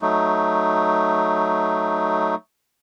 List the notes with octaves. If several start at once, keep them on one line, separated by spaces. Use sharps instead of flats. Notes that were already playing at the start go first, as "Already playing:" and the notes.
F#3 A3 D#4